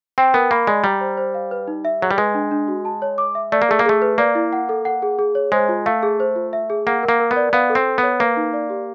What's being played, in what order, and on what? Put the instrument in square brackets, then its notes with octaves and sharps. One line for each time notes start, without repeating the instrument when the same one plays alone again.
[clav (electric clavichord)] C4 [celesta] G5
[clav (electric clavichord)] B3 [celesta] A#4
[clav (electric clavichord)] A#3 [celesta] B5
[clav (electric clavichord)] G#3 [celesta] D5
[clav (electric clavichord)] G3 [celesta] A#5
[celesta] C5
C5
F5
B4
D#4
E5
[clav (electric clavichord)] F#3 [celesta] G#4
[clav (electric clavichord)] G3
[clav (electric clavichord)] G#3 [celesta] B4
[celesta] D4
D4
F#4
A5
C#5
D6
E5
[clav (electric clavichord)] A3 [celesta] D5
[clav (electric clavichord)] A#3
[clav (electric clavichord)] A3 [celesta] G#4
[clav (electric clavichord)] A#3
[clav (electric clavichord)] A3 [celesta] G#4
[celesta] B4
[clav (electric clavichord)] A#3 [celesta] D5
[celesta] E4
F#5
A4
F#5
G#4
G#4
C#5
[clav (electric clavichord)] G#3 [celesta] C5
[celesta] F4
[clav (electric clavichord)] A3 [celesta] F5
[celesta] G#4
C5
F4
E5
G#4
[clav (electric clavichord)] A#3 [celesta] F#5
[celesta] A#4
[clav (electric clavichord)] A#3
[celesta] A#4
[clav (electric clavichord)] B3
[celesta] D5
[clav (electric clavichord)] B3 [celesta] F5
[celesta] A4
[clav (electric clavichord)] C4
[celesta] A4
[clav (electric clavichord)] B3 [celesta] C#5
[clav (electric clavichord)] A#3 [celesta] B4
[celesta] D#4
D5
G4